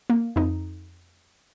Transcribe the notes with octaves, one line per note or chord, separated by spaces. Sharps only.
A#3
F2 D#4